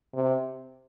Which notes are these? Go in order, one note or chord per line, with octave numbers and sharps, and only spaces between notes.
C3